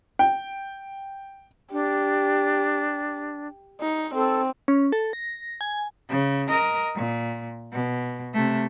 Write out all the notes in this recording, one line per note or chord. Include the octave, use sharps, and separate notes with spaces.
G5
D4 G4
D#4
C4 A4
C#4
A4
A#6
G#5
C#3
A#4 D#5
A#2
B2
C3 A3